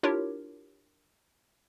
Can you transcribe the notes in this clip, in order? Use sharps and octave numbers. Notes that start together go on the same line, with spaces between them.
D4 E4 F4 G4 A#4 C#5